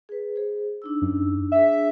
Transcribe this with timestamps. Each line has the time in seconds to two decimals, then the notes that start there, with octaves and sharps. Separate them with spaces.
0.09 G#4 B4
0.36 G#4 C5
0.82 D4 D#4 E6
1.02 F#2
1.52 D4 G#4 E5